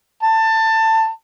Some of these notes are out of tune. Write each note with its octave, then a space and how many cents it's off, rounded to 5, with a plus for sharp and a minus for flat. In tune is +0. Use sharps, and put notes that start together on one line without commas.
A5 +20